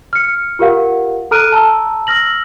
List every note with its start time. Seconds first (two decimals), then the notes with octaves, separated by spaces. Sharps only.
0.13 F6 C#7
0.59 F4 G4 A#4 F5 F#5
1.31 A4 A#5 F6 F#6 D7 D#7
1.52 A5 A#5 E6
2.07 E6 F6 A#6 F#7